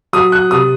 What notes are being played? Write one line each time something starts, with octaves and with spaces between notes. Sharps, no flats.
F#3 D#6
F#6
C3 D#6